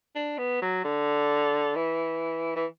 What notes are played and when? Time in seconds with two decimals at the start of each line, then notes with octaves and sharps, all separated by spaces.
0.15 D4
0.38 B3
0.62 F#3
0.84 D3
1.76 E3
2.56 E3